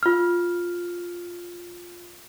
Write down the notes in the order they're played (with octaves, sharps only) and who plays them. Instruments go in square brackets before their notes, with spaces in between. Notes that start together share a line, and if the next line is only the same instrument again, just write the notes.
[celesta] F4 F6